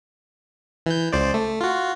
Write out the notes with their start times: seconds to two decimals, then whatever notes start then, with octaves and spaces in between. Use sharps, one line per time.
0.86 E3 G6
1.13 C#2 C5 D5
1.34 A3
1.61 F4 F#4